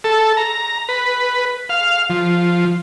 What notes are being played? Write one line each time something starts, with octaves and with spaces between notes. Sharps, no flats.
A4
A#5
B4
F5
F3